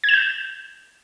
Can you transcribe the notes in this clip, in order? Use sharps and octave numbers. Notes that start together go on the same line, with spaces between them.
G#6
E7
G6